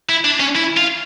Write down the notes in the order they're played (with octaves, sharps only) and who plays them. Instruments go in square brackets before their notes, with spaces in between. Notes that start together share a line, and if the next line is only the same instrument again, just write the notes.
[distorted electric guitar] E4
D4
C#4
E4
F4